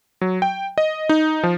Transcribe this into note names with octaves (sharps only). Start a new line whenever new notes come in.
F#3
G5
D#5
D#4
F3